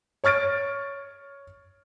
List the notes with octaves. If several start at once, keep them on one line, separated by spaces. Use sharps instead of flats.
C#5 C#6 F6 A6 D7